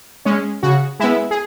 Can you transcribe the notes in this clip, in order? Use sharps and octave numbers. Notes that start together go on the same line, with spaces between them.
G#3 C#4
C#3 F#4
G#3 B3 E4
G#4